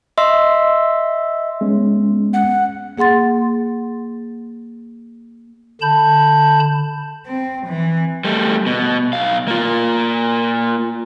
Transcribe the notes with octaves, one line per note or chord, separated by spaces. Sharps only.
D#5 E5 C6 E6
G#3 B3 C#4
F#5
A#3 G#4 F#5 C6 A6
D3 A5 B5 G6
C4
E3
G3 A3
B2
B1 F5
A#3 F4